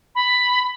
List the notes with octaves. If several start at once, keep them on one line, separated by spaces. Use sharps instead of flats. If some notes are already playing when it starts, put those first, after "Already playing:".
B5